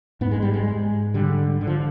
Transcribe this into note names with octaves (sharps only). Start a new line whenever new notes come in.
G#2 B3
G#3
G3
G#3
G#2
D3 G3
D3
F3